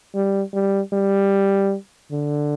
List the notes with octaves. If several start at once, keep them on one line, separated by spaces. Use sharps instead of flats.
G3
G3
G3
D3